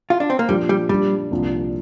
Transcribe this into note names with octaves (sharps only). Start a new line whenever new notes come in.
F4
D4
C4
A#3
A#2 F3 G3 D4
G3
A#2 F3 G3 D4 F4
C2 A#2 F3 D4